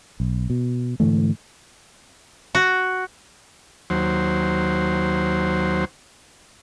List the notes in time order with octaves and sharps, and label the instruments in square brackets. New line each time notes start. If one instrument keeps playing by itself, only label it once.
[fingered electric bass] B1
B2
G#2 D3 E3 A3
[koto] F#4
[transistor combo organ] D#2 F#3 C5